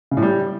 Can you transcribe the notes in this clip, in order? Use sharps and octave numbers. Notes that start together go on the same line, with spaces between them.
C#3
A2
G3